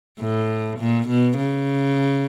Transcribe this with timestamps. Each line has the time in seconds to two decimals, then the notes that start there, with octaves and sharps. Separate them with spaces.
0.20 A2
0.79 A#2
1.09 B2
1.38 C#3